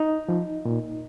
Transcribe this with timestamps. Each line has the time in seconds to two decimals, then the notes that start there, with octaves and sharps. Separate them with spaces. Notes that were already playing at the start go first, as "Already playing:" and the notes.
Already playing: D#4
0.29 F3
0.65 A#2